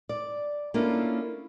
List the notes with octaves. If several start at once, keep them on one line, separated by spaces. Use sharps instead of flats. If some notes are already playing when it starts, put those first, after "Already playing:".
D5
A#3 C#4 D4 E4 F4 A4